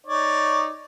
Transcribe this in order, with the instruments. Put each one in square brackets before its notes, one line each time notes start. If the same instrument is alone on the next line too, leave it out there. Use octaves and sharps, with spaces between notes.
[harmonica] D#4 C#5 D5